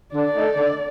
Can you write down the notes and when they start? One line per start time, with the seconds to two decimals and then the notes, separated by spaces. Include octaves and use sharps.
0.14 D3 D5
0.35 A3 D#4 A4
0.57 D3